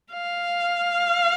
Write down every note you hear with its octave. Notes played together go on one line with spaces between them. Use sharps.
F5